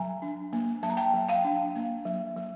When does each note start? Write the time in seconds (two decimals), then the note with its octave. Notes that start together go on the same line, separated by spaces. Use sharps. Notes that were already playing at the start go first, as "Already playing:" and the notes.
Already playing: F#3 G#5 A#5
0.22 D4
0.53 A#3
0.83 F#3 A5
0.90 A#5
0.97 G5 A5
1.14 F#3
1.29 F5 G5
1.45 D4
1.76 A#3
2.05 F#3
2.36 F#3